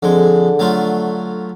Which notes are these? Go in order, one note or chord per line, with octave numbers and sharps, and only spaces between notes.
F2 D3 G#3
F#3 A3 F4